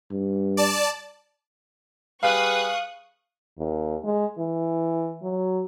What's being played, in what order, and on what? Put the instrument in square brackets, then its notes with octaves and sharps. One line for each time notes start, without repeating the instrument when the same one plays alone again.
[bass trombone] G2
[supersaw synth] D5 A5
[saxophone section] G3 G#4 B4 [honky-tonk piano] F5 [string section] C#6 D#6 F#6
[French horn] D#2
G#3
E3
F#3